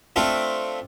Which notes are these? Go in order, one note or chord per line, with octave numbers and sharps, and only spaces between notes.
A3 C4 D4 F4